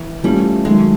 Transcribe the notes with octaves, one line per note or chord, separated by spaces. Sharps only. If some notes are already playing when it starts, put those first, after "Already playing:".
Already playing: E3
E3 G3 A3 C#4 F4
D#3 F#3 G#3 A3